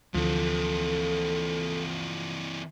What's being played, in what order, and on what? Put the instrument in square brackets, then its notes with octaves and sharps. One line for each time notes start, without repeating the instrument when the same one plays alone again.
[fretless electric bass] D2 [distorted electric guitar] E3 C4 [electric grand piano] F3 [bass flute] A4